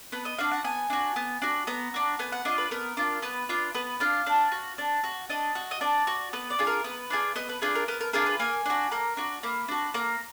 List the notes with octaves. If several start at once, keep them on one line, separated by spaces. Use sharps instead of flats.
B3 B4
D#5
D4 F#4 F5
F#5
B3 G#5
D4 F#4
B3
D4 F#4
B3 A#5
D4 F#4
B3 G#5
F#5
D4 F4 D#5
B4
B3 A#4
D4 F4
B3 B4
D4 F4
B3 B4
D4 F4 F5
D4
F#4
D4
F#4
D4 D#5
F#4
D#5
D4 D5
F#4
B3 B4
D5
D4 F4 G#4
A#4
B3 B4
D4 F4 G#4
B3 D#5
B4
D4 F4 G#4 B4
A#4
B3 A#4
A#4
D4 F4 G#4 A#4
B4
A#3 G#5
D4 F#4
A#3 A#5
D4 F#4
A#3 B5
D4 F#4
A#3 A#5